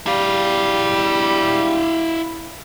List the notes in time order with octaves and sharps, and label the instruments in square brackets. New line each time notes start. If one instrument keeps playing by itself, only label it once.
[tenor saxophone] G3 [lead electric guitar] E4 F5